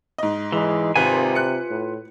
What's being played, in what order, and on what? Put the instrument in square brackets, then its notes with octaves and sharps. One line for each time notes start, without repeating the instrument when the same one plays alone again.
[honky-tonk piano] G#2 D#5
[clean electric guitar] E3 [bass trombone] G#3
[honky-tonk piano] G#1 [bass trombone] C3 [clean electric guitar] F4 B4 G#5
[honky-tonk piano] F#6 C#7
[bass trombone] A2